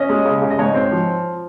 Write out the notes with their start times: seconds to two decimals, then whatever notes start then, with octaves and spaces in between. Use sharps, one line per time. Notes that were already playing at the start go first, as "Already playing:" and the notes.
Already playing: C#4 D#5
0.09 G#3
0.25 C#3
0.41 C#3
0.51 D#5
0.59 G#2 C#5
0.74 C4
0.91 F3